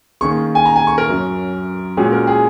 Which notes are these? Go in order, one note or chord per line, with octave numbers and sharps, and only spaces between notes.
D#3 A#3 C#4 G#4 C#6
G#5
A#5
G#5
C#6
A#4
F#2 F#3 C#4
A#2 G#3 C#4 F#4 G#4
A#4
G#4